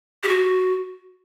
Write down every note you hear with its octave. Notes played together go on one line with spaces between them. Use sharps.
G4
F#4